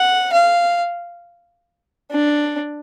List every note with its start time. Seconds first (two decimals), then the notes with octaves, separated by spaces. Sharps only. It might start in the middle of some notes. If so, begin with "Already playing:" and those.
Already playing: F#5
0.32 F5
2.11 D4